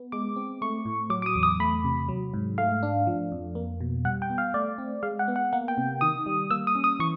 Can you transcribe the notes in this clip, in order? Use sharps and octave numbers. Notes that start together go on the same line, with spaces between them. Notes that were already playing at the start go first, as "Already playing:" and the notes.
Already playing: B3
G#3 D6
C4
A3 C#6
A2
F#3 D6
D6
D#6
E2
D#6
A3 B5
C3
F#3
G#2
A3 F5
D4
F3
F2
A#3
B2
G3 F#5
G5
B3
F5
A3 D5
C4
G#3 F5
F#5
B3
F#5
A#3 F#5
G5
C3
D#3 D#6
G3
A#3 E6
D#6
C#4
D#6
E3 C#6